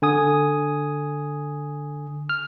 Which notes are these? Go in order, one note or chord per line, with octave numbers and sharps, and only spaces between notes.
D3 G#5 D#6
F6